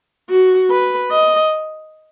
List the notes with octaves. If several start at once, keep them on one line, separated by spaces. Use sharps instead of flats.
F#4
B4
D#5